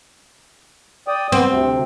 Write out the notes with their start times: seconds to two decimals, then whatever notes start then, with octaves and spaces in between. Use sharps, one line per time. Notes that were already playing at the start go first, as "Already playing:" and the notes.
1.08 D5 G5 D#6
1.32 B3 C4
1.47 D2 C3